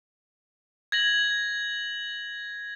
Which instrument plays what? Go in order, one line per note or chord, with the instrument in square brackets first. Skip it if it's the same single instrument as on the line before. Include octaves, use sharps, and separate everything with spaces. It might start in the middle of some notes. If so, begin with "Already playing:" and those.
[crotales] G#6 A#6 F#7